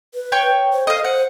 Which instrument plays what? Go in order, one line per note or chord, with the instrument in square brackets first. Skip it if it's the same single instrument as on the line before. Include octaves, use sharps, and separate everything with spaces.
[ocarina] B4
[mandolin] C#5 G5 C#6
[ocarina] C5
[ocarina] A4 [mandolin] D#5 F5
[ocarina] C5 [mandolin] F#5